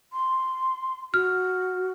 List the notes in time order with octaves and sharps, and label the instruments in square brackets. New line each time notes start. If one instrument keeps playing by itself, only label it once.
[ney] C6
[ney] F#4 [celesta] F6